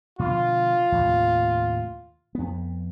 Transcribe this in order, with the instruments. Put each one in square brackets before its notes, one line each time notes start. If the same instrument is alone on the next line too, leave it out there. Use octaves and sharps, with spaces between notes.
[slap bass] B2 D3 F3 [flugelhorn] F4
[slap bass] D#2 A2 C3
F2 B3